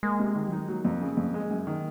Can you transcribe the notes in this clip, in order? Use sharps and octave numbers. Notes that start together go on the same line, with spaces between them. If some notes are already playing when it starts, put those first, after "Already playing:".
G#3 A#3
C3
D#3
F#3 D#4
G#3
F#3 A#3
F2
C#3
F2
G#3
F#2
D#3